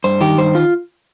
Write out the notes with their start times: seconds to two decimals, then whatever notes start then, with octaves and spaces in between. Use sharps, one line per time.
0.04 G2 C5
0.21 D#3 G4
0.37 G2 C5
0.55 F4